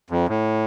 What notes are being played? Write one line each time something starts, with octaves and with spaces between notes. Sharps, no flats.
F2
A2